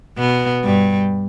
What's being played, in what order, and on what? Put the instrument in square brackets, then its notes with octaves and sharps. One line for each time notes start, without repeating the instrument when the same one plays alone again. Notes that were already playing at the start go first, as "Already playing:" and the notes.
[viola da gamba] B2 B3
G2 G3